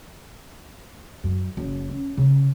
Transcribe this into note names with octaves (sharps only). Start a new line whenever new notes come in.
F#2
F#1
C#4
C#3